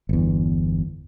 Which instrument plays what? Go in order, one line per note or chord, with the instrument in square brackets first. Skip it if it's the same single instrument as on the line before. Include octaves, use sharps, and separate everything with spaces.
[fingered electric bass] G1 E2